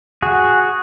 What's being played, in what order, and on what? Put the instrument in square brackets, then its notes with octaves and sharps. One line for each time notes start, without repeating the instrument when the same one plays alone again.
[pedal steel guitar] F#4 G#4